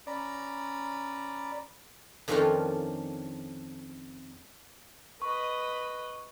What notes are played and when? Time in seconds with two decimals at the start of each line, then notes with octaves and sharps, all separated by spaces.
0.07 C#4 D5 A#5 B5
2.28 F2 D#3 F3 C#4 D4 F4
5.22 B4 D#5 C#6